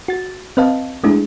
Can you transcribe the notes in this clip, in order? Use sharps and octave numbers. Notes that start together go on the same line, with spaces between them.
F#4 A6
C4 B4 D#5 F5 A5
G#3 A3 D4 E4 G#4